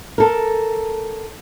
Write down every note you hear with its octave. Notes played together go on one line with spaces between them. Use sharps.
A4 A#4